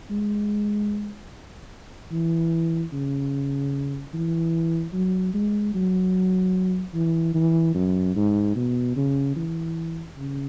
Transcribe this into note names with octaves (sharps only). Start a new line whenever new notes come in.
G#3
E3
C#3
E3
F#3
G#3
F#3
E3
E3
F#2
G#2
B2
C#3
E3
C#3